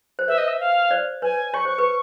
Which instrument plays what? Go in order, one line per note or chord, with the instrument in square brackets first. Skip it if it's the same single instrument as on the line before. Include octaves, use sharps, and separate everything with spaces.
[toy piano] C5
[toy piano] B4 C#5 [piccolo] E5
[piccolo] D#5
E5
F5
[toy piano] C5 D5
[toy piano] B4 C#5 [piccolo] G#5
[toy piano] C#5 [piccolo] C#6
[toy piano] C5
B4